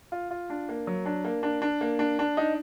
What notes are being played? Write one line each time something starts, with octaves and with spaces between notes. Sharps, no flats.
F4
F4
D4
A#3
F#3
D4
A#3
D4
D4
A#3
D4
D4
D#4